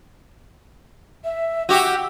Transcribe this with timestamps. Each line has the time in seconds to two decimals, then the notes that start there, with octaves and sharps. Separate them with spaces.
1.24 E5
1.69 F#4 G4 E6